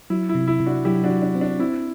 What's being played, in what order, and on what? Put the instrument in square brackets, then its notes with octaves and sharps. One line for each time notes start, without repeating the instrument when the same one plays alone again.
[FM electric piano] F#3 [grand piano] E4
[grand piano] E4
[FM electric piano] C3
[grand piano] E4
[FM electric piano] C3
[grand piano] D4 F#4
[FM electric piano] F#3 [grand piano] E4 G4
[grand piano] D4 F#4
[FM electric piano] F#3
[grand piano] D4
[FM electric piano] C4
[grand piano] D4
[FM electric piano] C4 [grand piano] E4